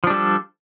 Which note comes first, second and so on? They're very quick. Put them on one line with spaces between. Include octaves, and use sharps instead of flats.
F3 D4 G3 A4